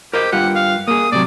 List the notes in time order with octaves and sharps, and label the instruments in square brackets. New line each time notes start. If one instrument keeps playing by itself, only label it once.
[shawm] G4 [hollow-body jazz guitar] A#4 C5 D#5
[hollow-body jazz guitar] G2 F4 G4 [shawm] F#5
[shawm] F5
[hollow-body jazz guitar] A#3 G#4 [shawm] D#6
[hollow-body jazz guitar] A2 C3 F#3 [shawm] D5